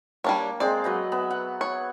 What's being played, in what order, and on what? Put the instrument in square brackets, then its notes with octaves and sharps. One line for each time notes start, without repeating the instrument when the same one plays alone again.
[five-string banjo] G3 D4 C#5 [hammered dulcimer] A#3
[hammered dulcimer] G#3 C4 [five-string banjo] D5
[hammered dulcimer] F#3 B4 D#5
B3 E5 B5
F#5
[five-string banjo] C#5